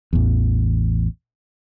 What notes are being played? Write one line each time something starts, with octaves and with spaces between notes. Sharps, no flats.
A1 E2